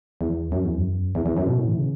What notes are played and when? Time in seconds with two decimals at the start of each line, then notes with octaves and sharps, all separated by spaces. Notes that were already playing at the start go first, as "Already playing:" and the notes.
0.21 E2
0.52 F#2
0.64 E2
0.77 F#2
1.15 E2
1.26 E2
1.37 F#2
1.47 B2
1.58 A2
1.68 E3
1.78 C#3